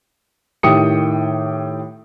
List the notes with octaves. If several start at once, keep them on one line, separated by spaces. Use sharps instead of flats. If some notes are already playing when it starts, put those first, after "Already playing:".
A2 D#3 G4 G5 D#6 C#7